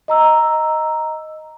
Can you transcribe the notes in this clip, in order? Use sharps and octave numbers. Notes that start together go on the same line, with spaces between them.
D#5 A#5 E6